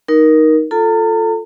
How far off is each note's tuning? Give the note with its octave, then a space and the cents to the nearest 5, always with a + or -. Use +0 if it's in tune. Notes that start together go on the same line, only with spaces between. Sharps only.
D#4 +0 A#4 +15
F4 +0 A4 +0 A#5 -40